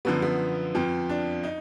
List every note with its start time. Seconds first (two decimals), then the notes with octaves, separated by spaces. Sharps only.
0.05 F#2 D3 F3 B3
0.22 B3
0.75 F2 F3
1.09 D4
1.43 D#4